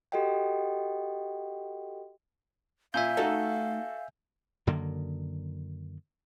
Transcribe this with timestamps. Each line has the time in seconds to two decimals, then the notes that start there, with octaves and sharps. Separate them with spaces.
0.12 F#4 G4 A4 D#5 F#5 G5
2.94 A#2 E5 F5 G#5 G6
3.17 A3 D#4 F#4 A4
4.67 F#2 D3 D#3 A#3